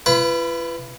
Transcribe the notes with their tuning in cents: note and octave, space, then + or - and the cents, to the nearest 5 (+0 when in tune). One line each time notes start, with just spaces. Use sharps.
F4 -45 B4 +5